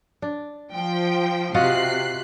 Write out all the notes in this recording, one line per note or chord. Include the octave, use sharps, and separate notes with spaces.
D4
F3 G5
C3 F4 F#4 D#5 F#6 C7